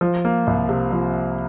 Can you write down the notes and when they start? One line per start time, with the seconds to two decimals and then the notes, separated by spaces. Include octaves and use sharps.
0.01 F3
0.25 A#3
0.47 C2
0.69 C3
0.92 F3